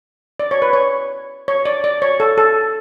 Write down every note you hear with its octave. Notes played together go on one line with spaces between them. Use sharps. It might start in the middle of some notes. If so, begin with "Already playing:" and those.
D5
C#5
B4
C#5
C#5
D5
D5
C#5
A4
A4